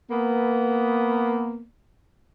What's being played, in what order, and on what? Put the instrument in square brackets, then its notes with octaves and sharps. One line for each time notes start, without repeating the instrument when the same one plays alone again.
[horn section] A#3 B3